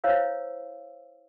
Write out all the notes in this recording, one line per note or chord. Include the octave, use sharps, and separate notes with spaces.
E4 C5 C#5 F5 E6